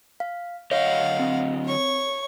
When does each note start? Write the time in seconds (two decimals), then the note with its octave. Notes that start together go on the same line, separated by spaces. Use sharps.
0.20 F5
0.71 D3 F#3 C#5 D#5 F5 F#5
1.20 C4
1.66 C#5 C#6